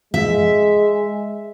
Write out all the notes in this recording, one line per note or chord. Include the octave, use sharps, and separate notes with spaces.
G#3 E5